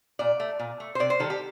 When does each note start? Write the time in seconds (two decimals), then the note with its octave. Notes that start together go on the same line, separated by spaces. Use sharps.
0.19 A#2 D5
0.40 A3
0.59 A#2
0.80 A3
0.95 C5
0.99 C3 D5
1.10 C5
1.20 D#3 G3 A4
1.30 G4